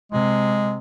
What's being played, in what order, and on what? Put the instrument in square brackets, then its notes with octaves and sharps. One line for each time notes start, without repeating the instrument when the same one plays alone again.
[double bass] C3 [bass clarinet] G#3